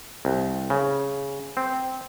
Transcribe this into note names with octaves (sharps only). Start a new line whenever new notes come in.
C2
C#3
C4